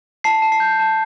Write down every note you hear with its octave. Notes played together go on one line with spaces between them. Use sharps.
A5 C7
A5
C7
G6
A5